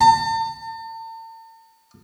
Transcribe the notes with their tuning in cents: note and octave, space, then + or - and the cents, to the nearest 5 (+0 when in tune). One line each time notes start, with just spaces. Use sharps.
A5 +45